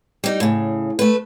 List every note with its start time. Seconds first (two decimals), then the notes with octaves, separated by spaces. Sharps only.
0.24 G3 D#4
0.40 A2 C#3
0.99 A3 B4